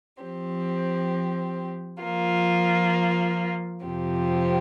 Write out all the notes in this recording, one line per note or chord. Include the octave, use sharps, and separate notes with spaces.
F3 C4 G4
F3 A#3 F4
F2 C3 F3 C4 G4